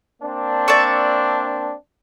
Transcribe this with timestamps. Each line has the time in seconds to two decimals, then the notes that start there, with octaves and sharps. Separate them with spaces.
0.22 A#3 C4 D4
0.68 D5 E5 C#6